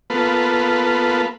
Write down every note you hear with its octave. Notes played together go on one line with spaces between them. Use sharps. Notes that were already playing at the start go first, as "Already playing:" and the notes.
A#3 B3 F4 A4 B4